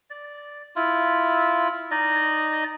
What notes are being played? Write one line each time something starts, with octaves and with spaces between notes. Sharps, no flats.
D5
E4 F4
D#4 D5 D#5